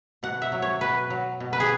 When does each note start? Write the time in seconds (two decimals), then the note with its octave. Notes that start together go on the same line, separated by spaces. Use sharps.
0.23 B2 F#5
0.42 E5
0.52 F#3
0.62 C#5
0.81 B2 B4
1.10 F#3
1.40 B2
1.53 B4
1.60 G#4